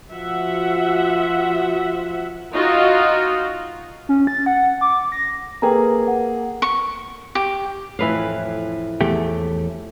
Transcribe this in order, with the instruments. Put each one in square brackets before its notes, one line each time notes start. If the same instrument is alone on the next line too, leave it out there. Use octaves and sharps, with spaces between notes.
[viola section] F3 F#4 E5 F#5
D#4 F4 F#4 D#5 F5
[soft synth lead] C#4
A6
F#5
D6
A#6
[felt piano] A#3 G#4 A4 [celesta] B4 G5 A#5
[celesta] F#5
[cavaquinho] C#6
G4
[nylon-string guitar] F2 A2 [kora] E3 B4 F5
[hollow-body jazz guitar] E2 A3 G4